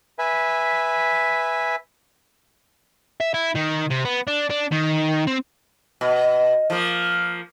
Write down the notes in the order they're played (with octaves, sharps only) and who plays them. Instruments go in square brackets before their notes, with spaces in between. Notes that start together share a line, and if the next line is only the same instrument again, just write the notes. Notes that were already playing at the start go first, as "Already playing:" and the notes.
[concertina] B4 E5 G#5
[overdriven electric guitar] E5
E4
D#3
C3
B3
D4
D4
D#3
C4
[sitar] B2
F3 A#3